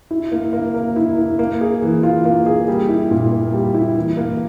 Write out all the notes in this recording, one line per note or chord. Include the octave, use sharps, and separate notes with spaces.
E4
A#3
A#3
A#4
E4
A#3
A#3
G#4
E3
F4
A#3
G#4
G3
E4
A#2
A#3
G3
E4
E3
A#3